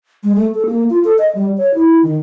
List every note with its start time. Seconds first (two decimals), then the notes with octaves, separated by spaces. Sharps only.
0.24 G#3
0.36 A3
0.55 A4
0.66 A#3
0.90 F4
1.04 A4
1.18 D#5
1.35 G3
1.58 C#5
1.75 E4
2.03 D#3